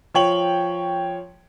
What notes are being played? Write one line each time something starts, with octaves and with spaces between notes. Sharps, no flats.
F3 C#5 G5 F#7